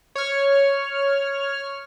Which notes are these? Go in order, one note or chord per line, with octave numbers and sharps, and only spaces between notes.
C#5 F6